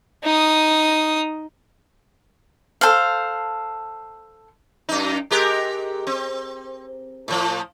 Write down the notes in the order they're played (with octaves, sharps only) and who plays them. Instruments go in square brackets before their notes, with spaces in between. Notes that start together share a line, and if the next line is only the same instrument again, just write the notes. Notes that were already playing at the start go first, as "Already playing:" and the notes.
[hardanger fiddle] D#4 D#6
[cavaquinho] A4 C5 F5
[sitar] F#2 D#4
G#3 G4 A#4
C4
A2 F3